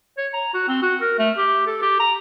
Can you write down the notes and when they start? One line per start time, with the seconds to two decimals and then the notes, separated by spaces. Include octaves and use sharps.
0.18 C#5
0.34 A#5
0.54 F#4
0.68 C4
0.82 F#4
1.01 A#4
1.19 A3
1.38 G4
1.67 A4
1.82 G4
2.00 A#5